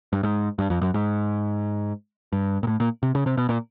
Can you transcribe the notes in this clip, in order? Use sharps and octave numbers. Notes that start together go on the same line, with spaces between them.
G2
G#2
G2
F2
F#2
G#2
G2
A#2
A2
A#2
C3
C#3
C3
B2
A#2